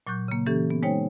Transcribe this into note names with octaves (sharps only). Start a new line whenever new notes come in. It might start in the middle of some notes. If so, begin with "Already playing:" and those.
A#2 F#3 C#6 F#6 G6
C#3 A#3
E3 A#3 C#4 G4 A4
B3
G#3 D#4 C5 C#5 G5